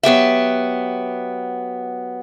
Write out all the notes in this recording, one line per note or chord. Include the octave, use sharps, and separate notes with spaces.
F#3 B3 G4 E5